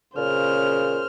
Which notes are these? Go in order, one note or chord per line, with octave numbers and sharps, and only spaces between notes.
A#2 C#3 C5 F6